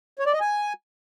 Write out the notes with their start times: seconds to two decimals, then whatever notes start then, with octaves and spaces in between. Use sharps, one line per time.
0.19 C#5
0.26 D5
0.33 D#5
0.41 G#5